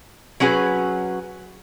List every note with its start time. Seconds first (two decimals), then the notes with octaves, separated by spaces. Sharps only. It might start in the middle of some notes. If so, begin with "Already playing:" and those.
0.40 F#3 C#4 F#4 G#4 B4